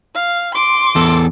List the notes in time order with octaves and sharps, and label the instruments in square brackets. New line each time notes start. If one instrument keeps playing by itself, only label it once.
[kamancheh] F5
C6 D6
[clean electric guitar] E2 A4